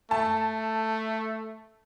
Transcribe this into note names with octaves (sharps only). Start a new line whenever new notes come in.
A3 A5